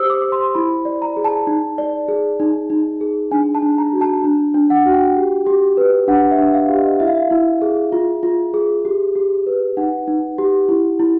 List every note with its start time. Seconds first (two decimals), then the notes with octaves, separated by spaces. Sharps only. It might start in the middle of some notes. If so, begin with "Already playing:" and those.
Already playing: G4 C5 D#6 E6
0.10 D6
0.24 C5
0.32 C6
0.55 E4 B5
0.85 D5
1.02 A#5
1.17 G#4
1.24 A5
1.47 D#4
1.78 D5
2.08 G#4
2.40 D#4
2.70 D#4
3.01 G#4
3.31 D4 G#5
3.55 A5
3.62 D4
3.78 A#5
3.93 F#4
4.01 A5
4.24 D4
4.54 D4
4.70 F#5
4.86 F#4
4.93 G5
5.17 G4
5.47 G4
5.77 B4
6.08 D4 F#5
6.31 E5
6.39 D4
6.54 F5
6.69 G4
6.77 D#5
7.00 E4 E5
7.07 F5
7.15 E5
7.31 E4
7.62 G#4
7.92 F4
8.23 F4
8.54 G#4
8.85 G4
9.15 G4
9.47 B4
9.77 D#4 F#5
10.07 D#4
10.38 G4
10.69 E4
11.00 E4